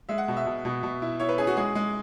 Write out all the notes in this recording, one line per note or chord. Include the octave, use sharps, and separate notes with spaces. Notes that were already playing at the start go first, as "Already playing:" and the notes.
G#3 E5
F#5
B2
E5
B2
B2
B2
E4
E4 C#5
B4
C#4 G#4
F#4
G#3 G#4
G#3